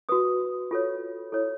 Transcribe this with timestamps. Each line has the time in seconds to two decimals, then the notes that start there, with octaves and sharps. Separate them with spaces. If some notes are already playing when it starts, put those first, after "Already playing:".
0.09 F#4 B4 D#6
0.71 F4 A4 C#5
1.32 E4 A4 C#5